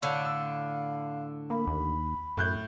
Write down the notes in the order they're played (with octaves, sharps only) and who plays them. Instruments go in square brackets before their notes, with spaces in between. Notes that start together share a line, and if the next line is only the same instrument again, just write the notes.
[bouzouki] A2 D3 D4 [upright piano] C#5 [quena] F5
[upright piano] E6
[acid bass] A#3 [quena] B5
[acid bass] D#2
[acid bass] F#2 [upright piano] A2 F#6 G6